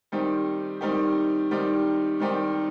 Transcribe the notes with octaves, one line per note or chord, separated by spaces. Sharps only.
D#3 G3 C4 D#4 G4
D#3 G3 C4 D#4 G4
D#3 G3 C4 D#4 G4
D#3 G3 C4 D#4 G4